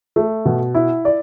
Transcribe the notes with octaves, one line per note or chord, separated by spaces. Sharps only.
A3
B2
E4
D5